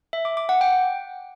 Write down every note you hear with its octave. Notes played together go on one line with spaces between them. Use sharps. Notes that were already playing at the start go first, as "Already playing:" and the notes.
E5
D6
D6
F#5
G5